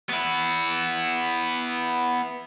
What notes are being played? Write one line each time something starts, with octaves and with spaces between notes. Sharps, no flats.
B3 E4